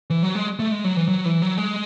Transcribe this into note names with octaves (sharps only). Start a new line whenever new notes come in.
E3
F#3
G#3
A3
G#3
F#3
E3
F#3
E3
F#3
G#3